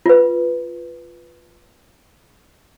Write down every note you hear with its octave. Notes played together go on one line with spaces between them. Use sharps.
F4 B4